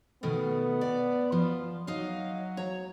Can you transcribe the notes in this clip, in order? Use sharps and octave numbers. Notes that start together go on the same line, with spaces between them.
B2 D#3 A3 B3
D5
F3 F4
F#3 D#4 F5
C#5 A#5